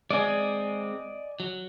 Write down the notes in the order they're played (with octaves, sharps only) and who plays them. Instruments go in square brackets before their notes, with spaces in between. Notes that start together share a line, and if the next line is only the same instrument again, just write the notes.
[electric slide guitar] G#3 C4 [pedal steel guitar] D5 D#5 G#5
[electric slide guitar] F#3